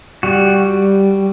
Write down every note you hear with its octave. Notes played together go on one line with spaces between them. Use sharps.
G3 F#4